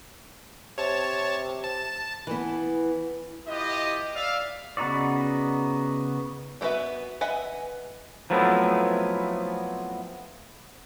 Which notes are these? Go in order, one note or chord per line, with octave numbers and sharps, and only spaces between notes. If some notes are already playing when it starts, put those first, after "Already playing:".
C3 C#5 A5
A5
E3 B3
E4 F4 G4 B4 D#5
D5 E5 F5
C#3 B3 D#4 F#4 D5
G3 B3 F#4 B4 E5
B4 D#5 E5 F#5 G#5
F3 F#3 A3 B3 C4 E4